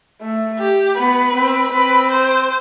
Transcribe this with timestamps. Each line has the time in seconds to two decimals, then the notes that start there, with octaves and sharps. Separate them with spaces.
0.21 A3
0.59 G4
0.97 B3 B4
1.35 C4
1.73 C4 B4
2.11 C5